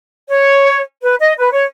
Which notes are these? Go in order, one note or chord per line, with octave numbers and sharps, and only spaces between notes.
C#5
B4
D#5
B4
C#5